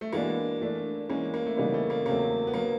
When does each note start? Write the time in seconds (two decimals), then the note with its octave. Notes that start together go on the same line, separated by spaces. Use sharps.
0.01 A3
0.13 E3 G#3 A#3 B3 D4 F#4
0.61 E3 A3 D4
1.09 E3 G#3 A#3 C#4
1.34 A#3
1.46 A3
1.57 C#3 E3 G3 A#3 B3 D#4
1.74 A3
1.90 A#3
2.05 E2 C#3 F#3 A3 A#3 C4
2.47 B3
2.54 D3 F#3 A#3